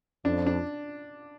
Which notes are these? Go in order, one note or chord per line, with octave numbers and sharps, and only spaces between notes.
F2 D4
D4